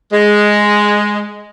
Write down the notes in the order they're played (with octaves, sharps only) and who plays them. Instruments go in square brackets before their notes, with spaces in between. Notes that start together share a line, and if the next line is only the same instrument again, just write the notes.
[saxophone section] G#3